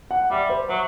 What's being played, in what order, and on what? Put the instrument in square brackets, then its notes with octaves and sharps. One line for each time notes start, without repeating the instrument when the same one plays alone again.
[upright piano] F#5
[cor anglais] G3 [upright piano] E5
[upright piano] C5
[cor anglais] F#3 [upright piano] E5